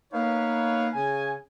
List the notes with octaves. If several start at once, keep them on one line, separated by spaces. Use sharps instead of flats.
A#3 B3 D#4 B4 C#5 F5
C#3 G#5